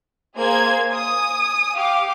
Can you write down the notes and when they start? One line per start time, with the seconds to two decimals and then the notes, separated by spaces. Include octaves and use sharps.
0.36 A#3 G#4 C5 G#6
0.94 G#5 D#6
1.76 G4 F5 D6